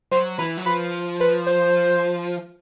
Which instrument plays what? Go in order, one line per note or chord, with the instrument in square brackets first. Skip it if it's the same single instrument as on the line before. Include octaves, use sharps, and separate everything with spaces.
[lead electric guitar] F#3 [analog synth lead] C5
[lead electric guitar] E3 [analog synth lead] B4
[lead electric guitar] F#3
[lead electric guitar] F3 [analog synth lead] B4
[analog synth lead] B4
C5